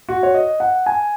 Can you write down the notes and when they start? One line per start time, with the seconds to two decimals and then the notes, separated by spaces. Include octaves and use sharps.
0.09 F#4
0.23 C#5
0.34 D#5
0.60 F#5
0.86 G#5